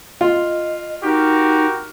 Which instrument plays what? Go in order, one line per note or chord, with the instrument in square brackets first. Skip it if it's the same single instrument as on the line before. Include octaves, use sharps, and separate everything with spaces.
[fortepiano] F4 [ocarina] D#5
[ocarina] D#4 [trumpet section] F#4 G4 A#4